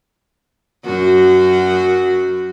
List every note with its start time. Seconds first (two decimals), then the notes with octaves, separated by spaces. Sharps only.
0.85 F#2 F#4